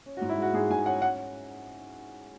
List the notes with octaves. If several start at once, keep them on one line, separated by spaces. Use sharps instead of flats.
C#4
F#4
G#2
E4
G#3 F#4
G#2 G#4
G#2 G#5
C#4 F#5
F#5